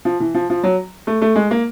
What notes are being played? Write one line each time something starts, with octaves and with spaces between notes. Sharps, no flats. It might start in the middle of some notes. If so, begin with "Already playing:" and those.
F3
E3
F3
F3
F#3
A3
A3
G#3
A#3